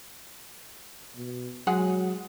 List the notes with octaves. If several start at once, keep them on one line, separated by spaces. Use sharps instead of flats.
B2
F#3 G#3 G#4 F#5